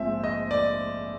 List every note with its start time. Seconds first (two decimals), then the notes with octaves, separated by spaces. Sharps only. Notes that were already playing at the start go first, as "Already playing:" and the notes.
Already playing: A#1 G#2 F3 G#3 C4 E5
0.24 D#5
0.51 D5